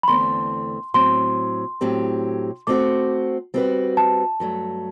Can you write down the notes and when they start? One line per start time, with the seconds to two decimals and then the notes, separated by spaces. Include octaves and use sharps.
0.03 B5
0.08 E2 D3 A3 C4 C6
0.94 A2 F#3 C4 C6
1.81 A2 F#3 C4 G4
2.67 A3 C4 F#4 C5 D6
3.54 G3 C4 F#4 B4
3.97 A5
4.40 G2 F#3 A3